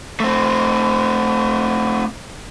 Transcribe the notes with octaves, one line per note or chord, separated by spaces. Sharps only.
A3 C4